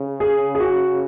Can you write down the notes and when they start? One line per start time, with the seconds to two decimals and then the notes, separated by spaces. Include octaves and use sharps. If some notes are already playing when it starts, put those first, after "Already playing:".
Already playing: C#3
0.20 G#4
0.55 G#4
0.60 F#4